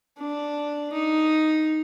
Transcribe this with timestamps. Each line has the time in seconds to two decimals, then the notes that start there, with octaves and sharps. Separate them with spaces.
0.19 D4
0.93 D#4